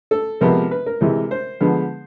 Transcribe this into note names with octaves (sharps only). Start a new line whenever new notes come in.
A4
C3 F3 G#3 B3 A#4
B4
A#4
C3 E3 G#3
C5
D3 F3 G#3 B3